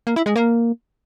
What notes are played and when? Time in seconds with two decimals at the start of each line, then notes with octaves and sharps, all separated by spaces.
0.07 A#3
0.16 E4
0.26 G#3
0.36 A#3